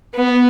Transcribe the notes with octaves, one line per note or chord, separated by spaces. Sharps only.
B3